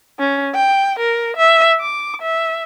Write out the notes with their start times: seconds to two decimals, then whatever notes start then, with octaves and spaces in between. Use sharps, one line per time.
0.19 C#4
0.55 G5
0.99 A#4
1.37 E5
1.81 D6
2.22 E5